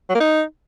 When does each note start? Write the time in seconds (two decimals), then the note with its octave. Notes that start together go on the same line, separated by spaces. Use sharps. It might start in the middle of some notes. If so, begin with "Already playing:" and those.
0.10 F#3
0.15 A#3
0.20 D#4